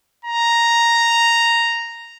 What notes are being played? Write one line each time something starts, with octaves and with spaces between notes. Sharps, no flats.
A#5